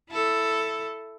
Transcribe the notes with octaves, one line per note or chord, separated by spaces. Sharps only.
E4 A4